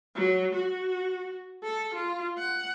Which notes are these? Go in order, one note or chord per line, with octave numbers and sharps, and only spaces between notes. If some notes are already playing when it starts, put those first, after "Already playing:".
F#3
F#4
A4
F4
F#5